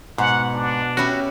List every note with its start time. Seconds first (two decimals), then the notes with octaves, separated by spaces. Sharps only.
0.18 G#2 B2 F#5
0.53 D4
0.97 C#4 E4 F#4 G4